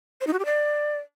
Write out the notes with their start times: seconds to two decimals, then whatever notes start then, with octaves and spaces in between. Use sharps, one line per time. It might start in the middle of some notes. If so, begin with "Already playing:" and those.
0.21 C5
0.27 D#4
0.33 F#4
0.39 G4
0.45 D5